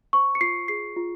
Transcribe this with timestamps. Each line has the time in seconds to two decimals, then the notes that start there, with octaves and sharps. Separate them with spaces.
0.13 C5 C#6
0.35 C#7
0.41 F4 C7
0.68 G#4 C7
0.97 F4